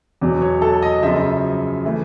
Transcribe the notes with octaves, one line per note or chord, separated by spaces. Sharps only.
E2 B2 F#3
C#5
A4
D#5
F#2 C#3 F3 E5
E3 A3